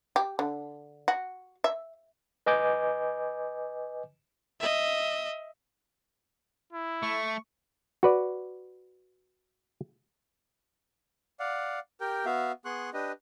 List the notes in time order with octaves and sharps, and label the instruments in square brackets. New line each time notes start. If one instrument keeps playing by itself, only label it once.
[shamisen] G4
D3
F#4
E5
[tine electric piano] B4 D#5 G#5 D6 G6
[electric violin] D#5 E5
[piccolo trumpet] E4
[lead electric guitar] A3 [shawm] C#6
[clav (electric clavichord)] F#4 B4 D5
[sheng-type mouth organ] D5 F5 F#5
G4 A#4 G5
B3 F#4 E5 F5
B3 G#4 C6 C#6 F#6
D4 G4 B4 D#5